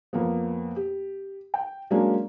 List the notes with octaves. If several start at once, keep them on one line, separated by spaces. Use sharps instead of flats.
F2 A#3 B3
G4
G5
F#3 G#3 A#3 C#4 D4